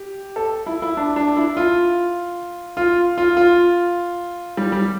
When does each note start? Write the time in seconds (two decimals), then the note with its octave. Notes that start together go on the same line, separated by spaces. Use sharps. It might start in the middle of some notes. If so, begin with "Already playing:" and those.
Already playing: G4
0.36 A4
0.66 E4
0.82 E4
0.97 D4
1.16 D4
1.37 E4
1.57 F4
2.77 F4
3.18 F4
3.37 F4
4.57 G3
4.72 G3